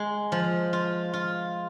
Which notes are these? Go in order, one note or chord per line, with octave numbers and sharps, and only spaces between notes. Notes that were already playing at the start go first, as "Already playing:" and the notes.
Already playing: G#3
F3
F4
F4